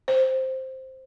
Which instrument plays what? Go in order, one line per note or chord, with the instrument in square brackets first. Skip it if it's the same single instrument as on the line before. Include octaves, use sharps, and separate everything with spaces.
[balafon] C5